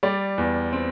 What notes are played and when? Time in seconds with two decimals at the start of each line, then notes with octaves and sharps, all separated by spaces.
0.03 G3 D5
0.38 E2
0.72 C4